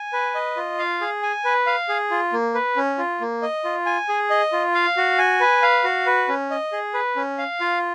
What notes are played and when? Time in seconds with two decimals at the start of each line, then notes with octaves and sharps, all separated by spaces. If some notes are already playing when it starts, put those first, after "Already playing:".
Already playing: G#5
0.13 B4
0.35 D#5
0.57 F4
0.79 F5
1.01 G#4
1.23 G#5
1.45 B4
1.67 F5
1.89 G#4
2.11 F4
2.33 A#3
2.54 B4
2.76 C#4
2.98 F4
3.21 A#3
3.42 D#5
3.64 F4
3.86 G#5
4.09 G#4
4.30 D#5
4.53 F4
4.74 F5
4.97 F#4
5.18 G#5
5.40 B4
5.62 F5
5.84 F#4
6.06 B4
6.28 C#4
6.51 D#5
6.72 G#4
6.94 B4
7.16 C#4
7.38 F5
7.60 F4